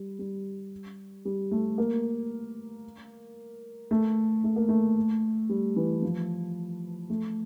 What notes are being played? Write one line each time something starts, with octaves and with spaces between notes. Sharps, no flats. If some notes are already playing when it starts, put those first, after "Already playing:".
Already playing: G3
G3
G3
A3
A#3
A3
A3
A#3
A3
G3
E3
F3
A3